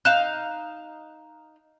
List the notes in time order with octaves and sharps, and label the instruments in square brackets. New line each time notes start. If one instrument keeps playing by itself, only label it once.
[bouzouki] D#4 F5 [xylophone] F#6 E7